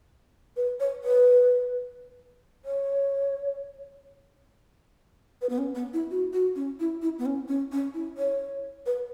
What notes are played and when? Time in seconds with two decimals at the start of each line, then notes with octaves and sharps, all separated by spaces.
0.56 B4
0.80 C#5
1.04 B4
2.65 C#5
5.42 B4
5.50 B3
5.58 C#4
5.75 B3
5.93 E4
6.11 F#4
6.33 F#4
6.56 C#4
6.80 E4
7.02 E4
7.19 B3
7.26 C#4
7.48 C#4
7.72 C#4
7.94 E4
8.18 C#5
8.86 B4